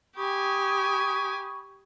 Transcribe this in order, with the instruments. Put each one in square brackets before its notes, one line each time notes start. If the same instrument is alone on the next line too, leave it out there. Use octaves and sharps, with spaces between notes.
[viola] G4 G#5 [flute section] B5 C#6 D#6